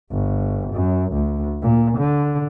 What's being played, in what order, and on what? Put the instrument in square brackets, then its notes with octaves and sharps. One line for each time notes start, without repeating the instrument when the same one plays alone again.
[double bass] G1
F#2
D2
A#2
D3